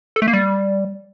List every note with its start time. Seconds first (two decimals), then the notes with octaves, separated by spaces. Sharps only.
0.16 A4
0.22 A3
0.28 A#3
0.33 G3